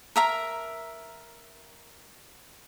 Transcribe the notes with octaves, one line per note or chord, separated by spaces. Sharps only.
A#4 E5 A#5